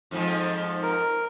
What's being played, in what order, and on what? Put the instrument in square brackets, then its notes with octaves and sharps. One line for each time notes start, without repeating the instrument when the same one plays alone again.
[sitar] F2 G#2 F3
[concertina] A#4